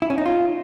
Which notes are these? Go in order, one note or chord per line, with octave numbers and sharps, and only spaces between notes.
E4
C#4
D#4
F4